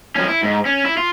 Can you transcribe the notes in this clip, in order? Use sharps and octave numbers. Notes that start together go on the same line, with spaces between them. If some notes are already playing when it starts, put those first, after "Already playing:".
F2 C#4
E4
G#2
C#4
E4
F4